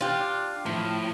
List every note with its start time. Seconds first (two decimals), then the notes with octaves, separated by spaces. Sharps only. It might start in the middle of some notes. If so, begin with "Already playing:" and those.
0.01 D4 F4 G4
0.66 A2 F3